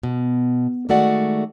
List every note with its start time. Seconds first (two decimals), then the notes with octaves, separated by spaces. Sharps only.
0.03 B2
0.89 D#3 G#3 A3 F#4 D5 F#5